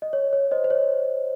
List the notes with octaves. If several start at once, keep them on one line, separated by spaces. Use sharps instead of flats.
D#5
C#5
C#5
C5 D#5
C5
C#5